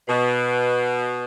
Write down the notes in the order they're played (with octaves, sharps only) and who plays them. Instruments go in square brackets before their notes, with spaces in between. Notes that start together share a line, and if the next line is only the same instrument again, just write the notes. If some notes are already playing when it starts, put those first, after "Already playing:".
[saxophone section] B2